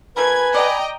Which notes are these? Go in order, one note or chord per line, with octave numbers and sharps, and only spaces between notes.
F3 A3 A#4 B4 G#5 B5 G#6
D5 D#5 G5 A#5